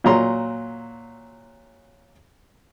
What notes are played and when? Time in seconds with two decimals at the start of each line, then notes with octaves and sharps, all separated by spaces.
0.04 A#2 F#3 A#5 C6